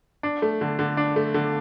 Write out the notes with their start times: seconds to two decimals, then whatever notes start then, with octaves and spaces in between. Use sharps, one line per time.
0.23 D4
0.42 A3
0.61 D3
0.79 D3
0.97 D4
1.16 A3
1.34 D3